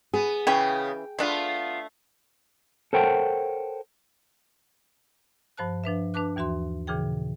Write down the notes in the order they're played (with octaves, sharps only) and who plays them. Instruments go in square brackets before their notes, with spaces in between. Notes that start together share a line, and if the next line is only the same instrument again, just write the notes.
[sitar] B3 [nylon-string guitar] G#4
[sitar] C#3 B3 [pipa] E3 C#4 C#6 [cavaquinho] G5
[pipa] A3 D4 [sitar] B3 F4
[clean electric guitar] A4 A#4 C5 C#5 F#5 G5
[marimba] G2 F3 C5 A5 F#6
F3 D4 B4 E5
D4 B4 A5 D6 F#6
D#2 E3 F#4 E5 C6
A#2 C#3 E3 G#4 G5